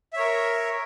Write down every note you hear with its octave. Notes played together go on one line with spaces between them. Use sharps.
A#4 C#5 E5